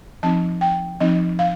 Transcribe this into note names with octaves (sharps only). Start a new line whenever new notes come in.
F3 C4 D#4 A5
G5
F3 C4 D#4 D#5
F5